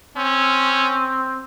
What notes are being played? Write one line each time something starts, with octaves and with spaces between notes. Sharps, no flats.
C4 C#4